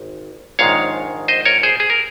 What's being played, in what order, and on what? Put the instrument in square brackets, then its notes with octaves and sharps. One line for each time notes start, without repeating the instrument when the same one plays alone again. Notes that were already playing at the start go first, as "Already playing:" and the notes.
Already playing: [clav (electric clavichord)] G#1
A#1 G#2 D#3 G#3 C#5 F5
C5 D#5
A#4 C#5
G#4 C5
G#4
A#4